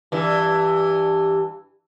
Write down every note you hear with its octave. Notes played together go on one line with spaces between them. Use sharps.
G2 E3